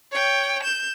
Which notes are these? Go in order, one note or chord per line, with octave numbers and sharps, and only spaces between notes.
C#5 G5
G6 E7